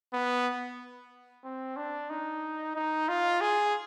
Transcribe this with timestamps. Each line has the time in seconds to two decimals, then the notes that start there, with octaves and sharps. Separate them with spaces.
0.14 B3
1.44 C4
1.77 D4
2.10 D#4
2.75 D#4
3.08 F4
3.41 G#4